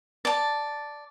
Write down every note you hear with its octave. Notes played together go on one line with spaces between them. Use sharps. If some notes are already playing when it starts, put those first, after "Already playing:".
D5 A5